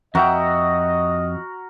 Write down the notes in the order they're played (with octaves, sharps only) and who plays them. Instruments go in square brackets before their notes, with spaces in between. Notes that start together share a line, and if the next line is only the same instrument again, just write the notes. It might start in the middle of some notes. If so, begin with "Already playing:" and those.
[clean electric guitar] F2 E5 G5 [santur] F#4 A#4 F#5 [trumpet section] D#5